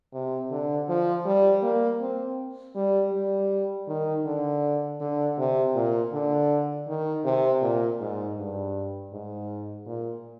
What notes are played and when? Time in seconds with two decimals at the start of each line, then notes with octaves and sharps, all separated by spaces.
0.14 C3
0.51 D3
0.89 F3
1.26 G3
1.63 A#3
2.01 C4
2.76 G3
3.13 G3
3.88 D#3
4.25 D3
5.00 D3
5.38 C3
5.75 A#2
6.13 D3
6.88 D#3
7.25 C3
7.62 A#2
8.00 G#2
8.38 G2
9.13 G#2
9.87 A#2